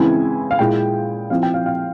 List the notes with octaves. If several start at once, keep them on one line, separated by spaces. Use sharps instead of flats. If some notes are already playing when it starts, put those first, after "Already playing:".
Already playing: C#3 E3 G#3 C4 E4 G#5
F5
A#2 G#3 E4 G5
F3 C4 E4 F5
G5
F5
F5